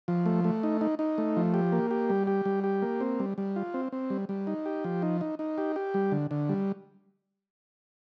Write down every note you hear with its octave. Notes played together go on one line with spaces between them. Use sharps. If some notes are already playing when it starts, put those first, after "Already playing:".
F3
A3
A3
D#4
D#4
D#4
A3
F3
G4
A#3
G4
G3
G4
G3
G4
A#3
C4
G3
G3
F4
C4
C4
G3
G3
D#4
G4
F3
D#4
D#4
D#4
G4
G4
G3
D3
D3
G3